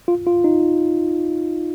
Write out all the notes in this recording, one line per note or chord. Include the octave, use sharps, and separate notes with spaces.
F4
F4
D#4